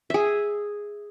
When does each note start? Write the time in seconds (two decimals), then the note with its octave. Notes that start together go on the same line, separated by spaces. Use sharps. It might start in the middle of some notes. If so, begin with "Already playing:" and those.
0.10 G#4 E5